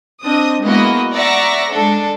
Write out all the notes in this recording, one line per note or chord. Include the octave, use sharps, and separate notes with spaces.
C4 D4 D#5 D#6
G#3 A#3 B3 E4 F#4 D#5
D5 E5 F#5 A#5 C#6 A#6
G#3 D4 A4